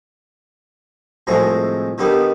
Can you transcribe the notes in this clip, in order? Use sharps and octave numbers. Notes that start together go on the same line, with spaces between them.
C2 A2 F3 G#3 A#5
D3 D#3 G3 B3